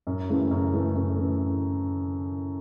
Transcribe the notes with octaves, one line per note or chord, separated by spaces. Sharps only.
F#2
C#3 E3 A3
F#2
C#3 E3 A3
F#2
C#3 E3 A3